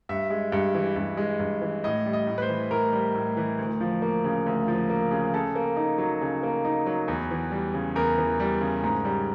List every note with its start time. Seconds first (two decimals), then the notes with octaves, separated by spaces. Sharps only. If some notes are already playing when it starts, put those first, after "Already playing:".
0.09 G2 E5
0.30 G#3
0.52 G2
0.74 E3
0.96 G2
1.17 G#3
1.39 G2
1.61 E3
1.84 A2 D#5
2.06 G3
2.13 D#5
2.27 A2
2.38 B4
2.42 C5
2.49 E3
2.70 A2 A#4
2.93 G3
3.14 A2
3.37 E3
3.58 D2
3.80 F3
4.02 A#3
4.24 C#3
4.46 D2
4.68 F3
4.90 A#3
5.11 C#3
5.34 C#3 A4
5.55 A#3
5.76 D#4
5.98 F#3
6.21 C#3
6.43 A#3
6.65 D#4
6.86 F#3
7.08 E2
7.31 E3
7.51 G3
7.74 C#3
7.95 E2 A#4
8.18 E3
8.40 G3
8.61 C#3
8.84 G#2
9.05 G3